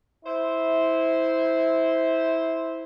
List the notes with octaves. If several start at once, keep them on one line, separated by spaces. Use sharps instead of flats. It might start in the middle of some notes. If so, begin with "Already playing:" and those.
E4 C5